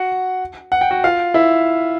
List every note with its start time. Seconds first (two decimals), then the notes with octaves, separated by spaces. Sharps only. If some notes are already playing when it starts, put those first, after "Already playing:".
Already playing: F#4 F#5
0.72 F#5
0.81 G5
0.91 F#4 F#5
1.04 F4 F5
1.34 E4 E5